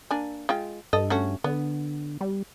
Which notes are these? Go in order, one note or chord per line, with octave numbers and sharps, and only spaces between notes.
A#3 D4 G#5
G#3 F4 G5
G2 A4 D#5
A3 C#4 F#4
D3 B3
G3